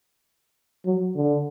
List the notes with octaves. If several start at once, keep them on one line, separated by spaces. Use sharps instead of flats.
F#3
D3